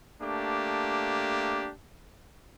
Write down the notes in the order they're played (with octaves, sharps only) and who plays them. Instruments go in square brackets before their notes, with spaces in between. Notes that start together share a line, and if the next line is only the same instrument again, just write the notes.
[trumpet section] A3 A#3 D4 G4